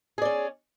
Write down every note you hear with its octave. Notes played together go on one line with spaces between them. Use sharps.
C#4 G#4 D5